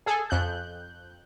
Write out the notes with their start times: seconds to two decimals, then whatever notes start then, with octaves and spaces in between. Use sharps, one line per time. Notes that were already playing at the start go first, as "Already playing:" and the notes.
0.06 G#4 A4 G#5
0.30 F2 F#6 G6